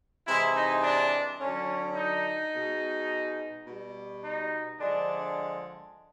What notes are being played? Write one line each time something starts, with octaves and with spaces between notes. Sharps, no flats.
C3 E3 G#3 E4
D#4
D4
D3 F#3 C#4
D#4
B2 G#3
B2 G3
D#4
D3 F3 G#3 D4